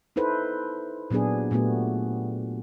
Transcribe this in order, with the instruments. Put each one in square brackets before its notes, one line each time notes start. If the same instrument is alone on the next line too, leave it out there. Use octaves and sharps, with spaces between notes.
[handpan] D#4 E4 A4 B4 C5
A#2 F#3 B3 D4 G#4
A#2 A3 B3 F#4 G4